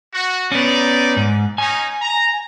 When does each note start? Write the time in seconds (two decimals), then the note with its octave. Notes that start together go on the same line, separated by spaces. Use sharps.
0.14 F#4
0.52 B3 C#4 D#4 D5
1.17 G#2
1.58 C#4 D#4 G#5
2.02 A#5